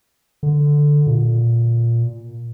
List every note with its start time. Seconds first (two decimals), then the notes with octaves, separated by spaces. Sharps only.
0.43 D3
1.07 A#2